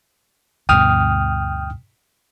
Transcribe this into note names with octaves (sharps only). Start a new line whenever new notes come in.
D2 G2 B2 G5 D#6 F6